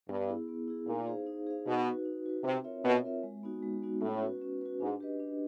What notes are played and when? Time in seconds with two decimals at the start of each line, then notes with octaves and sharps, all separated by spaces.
0.09 G2 B3
0.28 E4 G#4
0.48 B3
0.68 E4 G#4
0.87 A#2 D#4
1.07 G#4 C5 F5
1.27 D#4
1.46 G#4 C5 F5
1.66 B2 D#4
1.86 F#4 B4
2.05 D#4
2.26 F#4 B4
2.44 C3 C4
2.64 F4 A#4 C#5 E5
2.84 B2 C4
3.04 F4 A#4 C#5 E5
3.23 G#3
3.43 B3 D#4 F#4
3.63 G#3
3.83 B3 D#4 F#4
4.02 A2 C#4
4.22 F#4 B4
4.42 C#4
4.61 F#4 B4
4.81 G#2 D4
5.00 G4 B4 D#5
5.20 D4